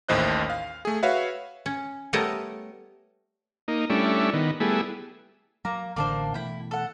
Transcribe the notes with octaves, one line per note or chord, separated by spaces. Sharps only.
A1 D#2 A2 C5 D#5 F#6
F5
A3 G#4
F#4 B4 C#5 E5 F5
C#4
G3 A3 B3 A#4 C#5 D#5
A#3 D#4
G3 A3 C#4 D4 E4
D#3 B3
G3 A3 B3 E4 G#4
F#3 A#3 A#5
A1 D3 E3 A#3 D4 C5
B2 E3 A3 E4 G5
A4 F#5